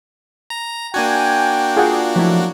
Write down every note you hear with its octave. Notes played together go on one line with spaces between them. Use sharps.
A#5
A#3 D4 F#4 G5 G#5
F4 G#4 D5 F#5
F3 F#3 A3 E4